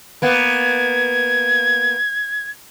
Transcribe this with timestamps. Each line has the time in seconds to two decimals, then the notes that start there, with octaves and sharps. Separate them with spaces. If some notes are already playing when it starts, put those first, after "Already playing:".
0.22 A#3 B3 G#6